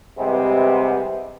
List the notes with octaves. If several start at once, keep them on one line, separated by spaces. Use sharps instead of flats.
C3 E3 G3 G#3 B3 C4